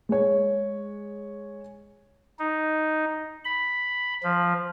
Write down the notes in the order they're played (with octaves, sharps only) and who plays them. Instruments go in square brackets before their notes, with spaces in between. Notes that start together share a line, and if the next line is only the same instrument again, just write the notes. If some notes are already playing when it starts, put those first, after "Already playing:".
[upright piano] G#3 C#5
[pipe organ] D#4
B5
F3